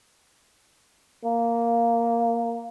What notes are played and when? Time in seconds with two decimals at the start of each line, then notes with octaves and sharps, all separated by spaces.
1.25 A#3